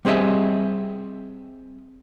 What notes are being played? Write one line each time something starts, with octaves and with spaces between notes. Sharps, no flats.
G3 C4 G#4 D#5 E5